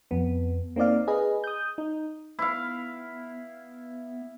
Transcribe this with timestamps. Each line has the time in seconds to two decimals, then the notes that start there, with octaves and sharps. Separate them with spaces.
0.11 F2 B3
0.76 A#3 C4 D#4 D5 F5
1.08 G#4 B4 D#5
1.44 D#6 G6
1.78 D#4
2.39 B3 E4 F5